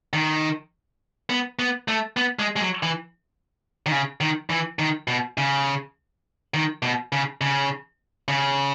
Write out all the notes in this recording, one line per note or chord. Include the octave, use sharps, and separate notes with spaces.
D#3
B3
B3
A3
B3
G#3
G#3
F#3
E3
D#3
C#3
D#3
E3
D#3
B2
C#3
D#3
B2
C#3
C#3
C#3